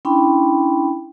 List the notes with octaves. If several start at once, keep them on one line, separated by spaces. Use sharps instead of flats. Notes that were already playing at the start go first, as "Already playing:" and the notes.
C#4 D4 E4 G5 B5 C6